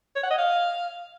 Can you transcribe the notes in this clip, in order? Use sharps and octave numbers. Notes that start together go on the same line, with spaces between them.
C#5
F#5
D#5
F5